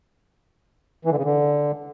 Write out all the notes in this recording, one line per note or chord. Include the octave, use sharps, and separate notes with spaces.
E3
D3
C#3
D3